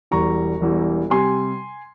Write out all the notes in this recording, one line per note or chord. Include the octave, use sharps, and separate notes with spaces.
E1 E2 E3 G3 A#5 C#6
E1 E2 E3 G3
C3 G3 G#5 C6